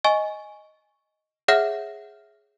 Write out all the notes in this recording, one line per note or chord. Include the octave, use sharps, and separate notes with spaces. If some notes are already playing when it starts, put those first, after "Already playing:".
D#5 G#5 C#6
G#4 C#5 E5 F#5 F6 A#6